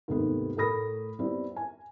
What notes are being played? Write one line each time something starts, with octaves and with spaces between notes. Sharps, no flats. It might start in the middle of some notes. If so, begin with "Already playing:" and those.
D#2 G#2 C3 A3 B3
A2 A3 A#4 B5 D#6 A#6
G3 B3 C4 E4
G#5